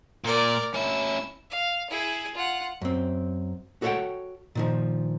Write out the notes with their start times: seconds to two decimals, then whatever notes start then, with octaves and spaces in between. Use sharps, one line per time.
0.24 A#2 A#4 D5
0.74 C#4 E4 E6
1.51 F5
1.90 E4 G#4
2.34 F4 F#5
2.82 F#2 C4
3.82 F#4 A4 C#5 E5 F#5 G5
4.55 A#2 D#3 F3